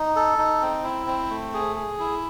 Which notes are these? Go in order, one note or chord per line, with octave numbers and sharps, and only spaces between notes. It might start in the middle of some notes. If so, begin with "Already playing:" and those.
Already playing: D#4
A4
D#4
C4
E4
C4
A3
G#4
G#4
E4